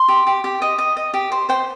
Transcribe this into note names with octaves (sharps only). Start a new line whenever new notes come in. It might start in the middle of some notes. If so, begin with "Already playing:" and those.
Already playing: C6
G4
G4
G4
D#5
D#5
D#5
G4
C5
C5 G5